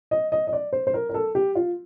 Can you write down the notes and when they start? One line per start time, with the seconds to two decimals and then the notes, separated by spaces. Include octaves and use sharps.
0.11 D#5
0.32 D#5
0.47 D#5
0.53 D5
0.73 C5
0.87 C5
0.94 A#4
1.09 A#4
1.14 A4
1.35 G4
1.55 F4